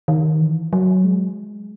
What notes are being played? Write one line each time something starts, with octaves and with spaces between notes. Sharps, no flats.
D#3
E3
F#3
G#3